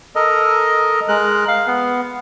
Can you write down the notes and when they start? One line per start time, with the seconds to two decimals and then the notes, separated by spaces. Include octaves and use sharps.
0.15 A4 A#4 D#5
1.08 G#3 A#4 F#6
1.48 F5
1.67 B3